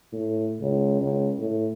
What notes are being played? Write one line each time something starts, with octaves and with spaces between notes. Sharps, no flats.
A2
C#2
C#2
A2